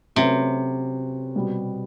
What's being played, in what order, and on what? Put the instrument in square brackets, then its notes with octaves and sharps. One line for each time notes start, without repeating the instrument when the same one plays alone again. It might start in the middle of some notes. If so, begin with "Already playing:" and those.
[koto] C3 [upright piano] F#3 A3 C#4 F#4 B4
[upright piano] B2 G3 B3